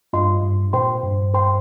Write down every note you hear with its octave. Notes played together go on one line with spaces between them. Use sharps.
G2 F4 D#5 C6
G2
A#2 C5 G5 C6
G2
C5 G5 C6